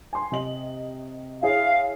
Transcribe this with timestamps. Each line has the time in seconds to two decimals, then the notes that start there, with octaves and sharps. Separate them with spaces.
0.13 G#5 C6
0.32 C3 D#5 F#7
1.43 E4 G#4 C#5 F5